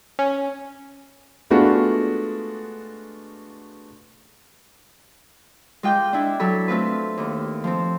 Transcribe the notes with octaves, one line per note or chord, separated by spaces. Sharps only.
C#4
G#3 A3 B3 D4 F4 F#4
G#3 F4 G5 D6 G6
D4 E4
F#3 E4 A4 B5
A3 C4 F4 B4
D#2
F3 C4